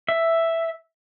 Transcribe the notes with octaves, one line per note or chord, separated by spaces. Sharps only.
E5